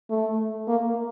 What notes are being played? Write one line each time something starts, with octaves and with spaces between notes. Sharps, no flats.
A3
A#3